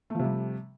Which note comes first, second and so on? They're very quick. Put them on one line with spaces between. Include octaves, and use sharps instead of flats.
A3 F3 C3 G3